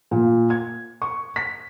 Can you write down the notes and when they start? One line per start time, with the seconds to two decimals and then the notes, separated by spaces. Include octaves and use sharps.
0.11 A#2
0.50 G#6
1.02 C#6
1.36 B6